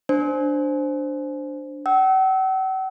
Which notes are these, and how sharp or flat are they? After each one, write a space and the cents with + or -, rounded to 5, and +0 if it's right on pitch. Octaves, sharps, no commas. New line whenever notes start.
D4 +0 C5 +0
F#5 +45 E6 -25